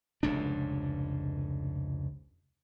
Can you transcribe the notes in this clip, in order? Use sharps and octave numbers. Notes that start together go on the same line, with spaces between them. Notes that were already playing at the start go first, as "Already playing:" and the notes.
F1 C#2 G#2 D4